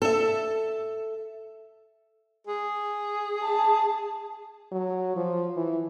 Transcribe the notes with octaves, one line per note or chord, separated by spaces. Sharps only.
A4 E5
G#4
A5
F#3
F3
E3